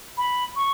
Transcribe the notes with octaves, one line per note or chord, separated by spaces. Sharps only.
B5
C#6